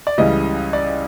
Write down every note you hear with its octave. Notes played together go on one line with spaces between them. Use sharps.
D5
C#2 C#3 E3 G3 D#5
D5